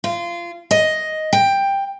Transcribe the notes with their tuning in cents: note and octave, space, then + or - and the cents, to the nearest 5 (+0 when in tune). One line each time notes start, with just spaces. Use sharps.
F4 -20
D#5 +5
G5 +10